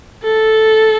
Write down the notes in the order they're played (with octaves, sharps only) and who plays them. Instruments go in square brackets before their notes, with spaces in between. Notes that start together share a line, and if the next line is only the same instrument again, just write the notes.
[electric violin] A4